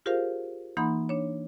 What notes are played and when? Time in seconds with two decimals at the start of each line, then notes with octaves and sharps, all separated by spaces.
0.06 F4 G4 G#4 A#4 C5 F5
0.77 E3 A#3 D#4 F#5 B5 C6
1.09 D4 C#5